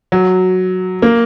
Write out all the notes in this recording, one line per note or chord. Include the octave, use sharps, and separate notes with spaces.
F#3
A#3